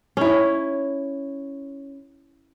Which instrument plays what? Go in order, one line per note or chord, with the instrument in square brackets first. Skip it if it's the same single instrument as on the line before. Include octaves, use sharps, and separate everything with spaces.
[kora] C#4 E4